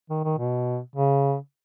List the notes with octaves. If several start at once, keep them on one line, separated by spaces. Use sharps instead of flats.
D#3
D#3
B2
C#3